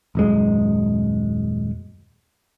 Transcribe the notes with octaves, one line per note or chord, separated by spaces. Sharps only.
D#1 F#2 G#3